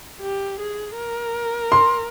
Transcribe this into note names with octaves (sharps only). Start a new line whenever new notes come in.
G4
G#4
A#4
C6